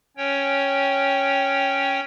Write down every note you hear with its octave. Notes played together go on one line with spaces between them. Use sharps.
C#4 C#5 G5